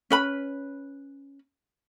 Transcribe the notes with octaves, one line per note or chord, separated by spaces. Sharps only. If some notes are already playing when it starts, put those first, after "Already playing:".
C#4 B4 B5